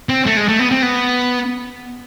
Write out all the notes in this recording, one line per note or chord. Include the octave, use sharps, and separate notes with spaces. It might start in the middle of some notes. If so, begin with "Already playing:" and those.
C4
A3
G#3
A3
B3
C4
B3